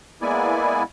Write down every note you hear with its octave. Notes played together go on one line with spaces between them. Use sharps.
G#3 A#3 B3 E4 D5 G#5